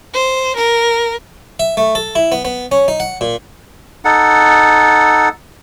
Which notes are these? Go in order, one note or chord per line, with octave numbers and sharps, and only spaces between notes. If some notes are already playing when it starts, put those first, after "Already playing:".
C5
A#4
E5
A3
A4
E4
B3
B3
C#4
D#4
F#5
A#2
D#4 A4 F#5